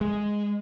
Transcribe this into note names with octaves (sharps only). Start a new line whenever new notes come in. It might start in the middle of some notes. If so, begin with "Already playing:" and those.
G#3